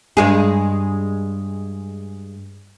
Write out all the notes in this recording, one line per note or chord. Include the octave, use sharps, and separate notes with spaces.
G2 G#3 G#4